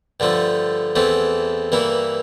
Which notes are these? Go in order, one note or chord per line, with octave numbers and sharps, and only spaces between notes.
G2 D3 F3 A3
E2 E3 A3 C4
G2 E3 A#3 E4